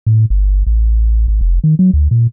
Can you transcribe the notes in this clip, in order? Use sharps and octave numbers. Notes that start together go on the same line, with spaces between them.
A2
G1
A1
G#1
F1
D#3
F#3
D2
A#2